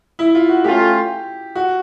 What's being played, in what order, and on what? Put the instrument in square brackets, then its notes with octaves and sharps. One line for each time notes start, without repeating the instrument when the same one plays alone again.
[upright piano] E4
F4
F#4
[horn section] A3 C#4 F4 [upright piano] G4
[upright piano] F#4